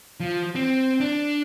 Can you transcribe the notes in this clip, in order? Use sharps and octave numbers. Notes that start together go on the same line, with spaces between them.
F3
C4
D4